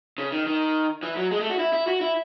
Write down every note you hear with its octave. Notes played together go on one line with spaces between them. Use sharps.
C#3
D#3
D#3
E3
F#3
G#3
A3
F#4
E4
E4
F#4
E4